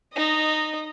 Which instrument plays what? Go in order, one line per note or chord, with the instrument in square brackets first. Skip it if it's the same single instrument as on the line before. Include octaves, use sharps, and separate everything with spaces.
[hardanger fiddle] D#4 D#5